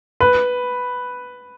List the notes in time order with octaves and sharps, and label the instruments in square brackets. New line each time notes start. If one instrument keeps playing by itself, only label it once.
[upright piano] B4